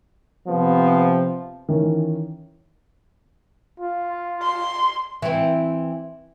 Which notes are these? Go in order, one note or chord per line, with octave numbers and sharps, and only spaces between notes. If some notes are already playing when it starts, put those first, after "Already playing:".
C3 F3 B3
D#3 E3 C#4
F4
C6
E3 C4